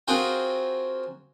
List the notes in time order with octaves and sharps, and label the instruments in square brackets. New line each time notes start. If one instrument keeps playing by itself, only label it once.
[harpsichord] C4 F4 F#4 G#4 A#4 G5